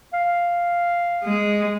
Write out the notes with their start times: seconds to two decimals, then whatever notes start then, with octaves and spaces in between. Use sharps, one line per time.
0.14 F5
1.24 G#3